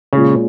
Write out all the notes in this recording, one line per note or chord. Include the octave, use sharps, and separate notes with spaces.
A#2 C#3 G#3 C#4 F4 G#4